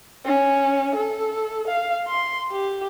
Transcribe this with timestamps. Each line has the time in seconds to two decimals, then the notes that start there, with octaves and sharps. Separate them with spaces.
0.25 C#4
0.95 A4
1.67 F5
2.07 C6
2.52 G4